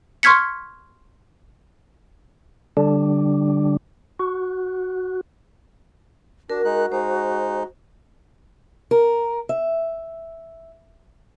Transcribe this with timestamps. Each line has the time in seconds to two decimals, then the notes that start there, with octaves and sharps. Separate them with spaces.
0.23 C6 C#6 F6 G#6 B6 C#7
2.77 D3 G3 D4
4.19 F#4
6.50 D4 F#4 A#4
6.65 G#3 D#4 F#6
6.92 G#3 D#4 C5
8.91 A#4
9.49 E5